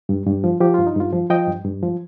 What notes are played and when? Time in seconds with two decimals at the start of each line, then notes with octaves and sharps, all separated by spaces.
0.09 G2
0.26 G2
0.44 F3
0.61 F3 G4
0.74 G2 F4
0.87 D#4
0.95 G2 F4
1.13 F3
1.30 F3 D#5 G5
1.48 G2
1.64 G2
1.82 F3